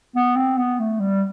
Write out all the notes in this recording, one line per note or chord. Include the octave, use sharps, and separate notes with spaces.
B3
C4
B3
A3
G3